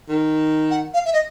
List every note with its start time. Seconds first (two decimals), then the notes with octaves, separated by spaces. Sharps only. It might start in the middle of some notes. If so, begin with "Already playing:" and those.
0.09 D#3
0.71 F#5
0.94 F5
1.05 E5
1.13 D#5